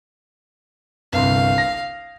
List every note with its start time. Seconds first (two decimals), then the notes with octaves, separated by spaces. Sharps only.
1.13 G1 C2 F5 C6
1.58 A#6